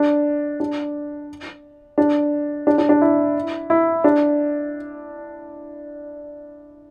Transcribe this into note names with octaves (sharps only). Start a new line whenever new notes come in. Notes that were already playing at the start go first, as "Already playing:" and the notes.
Already playing: D4
D4
D4
D4
D4
D4
E4
E4
D4